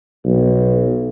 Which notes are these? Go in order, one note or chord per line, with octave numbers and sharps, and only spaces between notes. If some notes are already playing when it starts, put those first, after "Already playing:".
B1